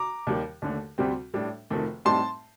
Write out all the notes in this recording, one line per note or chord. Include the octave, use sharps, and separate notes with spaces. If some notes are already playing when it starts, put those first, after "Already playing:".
Already playing: A#5 D6
D#2 D#3 G3
D#2 D3 A3
D2 C3 G3 C4
A2 G3 D4
F1 F2 D#3 A3
A2 G3 C4 D#4 A5 C6